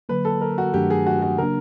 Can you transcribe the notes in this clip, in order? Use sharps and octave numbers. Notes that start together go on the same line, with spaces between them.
D3 F#3 A#3 B4
A4
A#4
F#4
G2 D#3 F#3 A3 D4 G4
G#4
F#4
F#4
C#3 F#3 A#3 D4 A#4